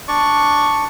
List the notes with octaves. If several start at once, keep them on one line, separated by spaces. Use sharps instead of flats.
D4 D5 C#6